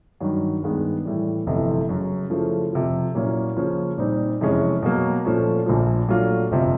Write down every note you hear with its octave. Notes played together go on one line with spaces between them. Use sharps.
G2 D#3 F#3
G2 D#3 G#3 B3
A2 E3 G3
G1 F2 C3 E3 A3
F#2 C#3 F#3
C#3 F3 A3 C#4 E4
F2 C3 F3
A#2 F#3 A#3 C#4 E4
C#3 F3 A#3 C#4
A#2 G3 C4 D#4
F2 C3 E3 G#3 C#4
B2 F#3 A#3
A#2 F3 A3 C#4
A#1 A#2 F3
A#2 F#3 A3 D4 F4
G1 F2 C3 F3